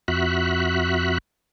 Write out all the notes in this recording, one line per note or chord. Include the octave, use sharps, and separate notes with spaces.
F2 F#4 E5 B5 F#6